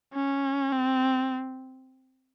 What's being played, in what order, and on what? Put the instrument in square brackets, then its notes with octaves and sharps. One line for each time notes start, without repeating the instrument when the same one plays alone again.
[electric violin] C#4
C4